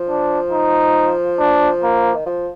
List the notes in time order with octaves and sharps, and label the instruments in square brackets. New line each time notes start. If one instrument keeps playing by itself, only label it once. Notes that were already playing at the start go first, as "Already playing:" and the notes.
Already playing: [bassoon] F3
[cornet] D4
D#4
D4
A#3
[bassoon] D#3
F3